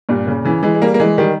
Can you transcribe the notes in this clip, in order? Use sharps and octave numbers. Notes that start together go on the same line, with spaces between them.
G2 A#2
A#2 C#3
C#3 E3
E3 G#3
G#3
G3 A#3
A#3
E3 G#3
D#3 G3